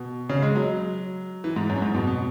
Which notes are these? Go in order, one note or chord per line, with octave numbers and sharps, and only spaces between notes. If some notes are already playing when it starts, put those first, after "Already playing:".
Already playing: B2
C#3
G#3
F#3
E3
G#2
F#2
G#2
B2
B2